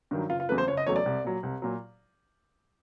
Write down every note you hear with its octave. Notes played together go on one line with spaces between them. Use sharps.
G2 D#3 F#3
F#1 F4
F4
E2 C#3 F#3 A3 B4
C5
F#1 C#5
D#5
E2 C#3 F#3 A3 C#5
D5
C2
A#2 F#3
C2
A#2 F#3